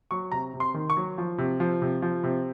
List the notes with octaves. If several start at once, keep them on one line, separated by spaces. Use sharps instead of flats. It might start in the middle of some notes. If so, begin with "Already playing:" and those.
F#3 C#6
C3 A#5
C3
C6
D#3
C#6
F#3
F3
C3
F3
C3
F3
C3